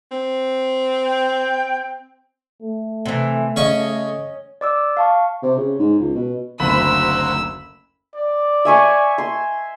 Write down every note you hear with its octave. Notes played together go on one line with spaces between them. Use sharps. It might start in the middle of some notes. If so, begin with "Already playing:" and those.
C4
G5
A3
C3 E3
C#3 C#4 D#5 C#6
D5 D6 E6
F5 A5 C#6
C3
C#3
G#2
C#2
B2
F#1 D2 A#3 C4 F#4 B5 E6
D5
E5 G#5 C#6
C6